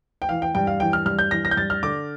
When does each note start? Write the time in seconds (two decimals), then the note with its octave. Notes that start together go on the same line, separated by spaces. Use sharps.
0.22 G5
0.29 E3 F5
0.42 G5
0.55 G2 G5
0.67 F5
0.80 E3 G5
0.93 F6
1.06 G2 F6
1.19 G6
1.31 E3 A#6
1.45 A#6
1.51 G6
1.57 G2 A6
1.70 F6
1.83 D3 D6